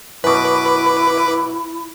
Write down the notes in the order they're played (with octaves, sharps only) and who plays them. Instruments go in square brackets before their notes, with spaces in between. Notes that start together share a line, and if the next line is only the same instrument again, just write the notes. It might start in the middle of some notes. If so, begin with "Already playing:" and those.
[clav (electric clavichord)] F#2 B2 [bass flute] E4 [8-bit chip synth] B4 D6